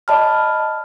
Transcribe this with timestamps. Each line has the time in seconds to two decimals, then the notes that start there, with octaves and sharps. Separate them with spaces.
0.08 D5 D#5 A5 B5 F6